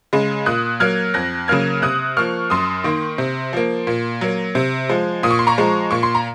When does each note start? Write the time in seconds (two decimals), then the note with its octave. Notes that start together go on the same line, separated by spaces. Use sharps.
0.13 C#3 G#3
0.46 A#2 D#6 F#6
0.80 F#3 A#3 F6 G#6
1.14 F2 F#6 A#6
1.48 C#3 F#3 A#3 F6 G#6
1.82 C3 D#6 F#6
2.17 F3 A#3 C#6 F6
2.50 F#2 C6 D#6
2.84 D#3 A#3
3.18 C3
3.53 F3 A#3
3.87 A#2
4.21 F#3 A#3
4.55 C3
4.89 F3 G#3
5.23 A#2 D#6
5.31 C#6
5.39 C6
5.47 A#5 C#6
5.58 F3 G#3
5.91 A#2 C#6
6.03 C6
6.15 A#5